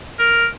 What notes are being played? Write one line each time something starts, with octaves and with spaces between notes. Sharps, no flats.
A#4